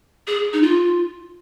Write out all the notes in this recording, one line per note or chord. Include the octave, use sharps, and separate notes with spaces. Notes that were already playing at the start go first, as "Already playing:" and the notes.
G#4
D#4
F4